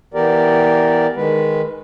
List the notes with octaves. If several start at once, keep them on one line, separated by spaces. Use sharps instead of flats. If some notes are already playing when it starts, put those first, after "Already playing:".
E3 B3 G4 A#4 D5
D#3 G#3 B4